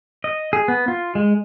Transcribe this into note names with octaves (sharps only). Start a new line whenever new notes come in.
D#5
G#4
B3
F4
G#3